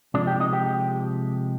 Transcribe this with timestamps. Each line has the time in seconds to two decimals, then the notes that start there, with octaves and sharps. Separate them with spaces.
0.14 C3 F3 G#3 D4 D5
0.27 G4 G5
0.40 D#4 D#5
0.53 G4 G5